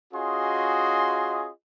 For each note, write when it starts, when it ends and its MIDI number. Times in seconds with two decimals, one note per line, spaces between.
0.13 1.48 61
0.13 1.48 65
0.13 1.48 66
0.13 1.48 68
0.13 1.48 75
0.13 1.48 84